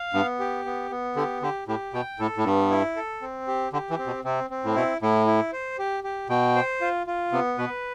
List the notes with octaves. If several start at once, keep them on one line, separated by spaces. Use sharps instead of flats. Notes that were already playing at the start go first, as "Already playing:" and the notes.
Already playing: F5
G2 B3
G4
B3
B3
D3 G4
D3 G4
A2 G4
B2 G5
A2 A4
A2
G2 B3
E4
A4
C4
G4
D3 G4
E3
C4
B2
C3 C4
C4
A2
B2 E4
A2 E4
E4
C5
G4
G4
B2 G5
C5
F4
F4
C3 B3
B2 B4